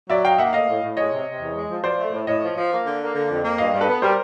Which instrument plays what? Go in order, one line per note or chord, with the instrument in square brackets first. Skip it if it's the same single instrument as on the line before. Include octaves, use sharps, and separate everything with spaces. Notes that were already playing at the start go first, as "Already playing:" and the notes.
[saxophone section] F#3 [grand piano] D5 E5
[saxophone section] D#4 [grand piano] F5 G5
[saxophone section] A#3 [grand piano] E5 F#5
[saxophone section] A2 [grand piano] D#5 F5
[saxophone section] A2
A2
[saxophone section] G#3 [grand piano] C#5 D#5
[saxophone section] C3
C3
E2
G#3
F3
[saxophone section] F3 [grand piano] C5 D5
[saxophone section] A3
A2
[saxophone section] A2 [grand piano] C#5 D#5
[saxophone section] F3
F3
A#3
D3
A#3
D3
F2
A#3
[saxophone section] G2 [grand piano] D#5 F5
[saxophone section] G2
[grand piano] A4 B4
[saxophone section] B3
[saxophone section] G3 [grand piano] A#4 C5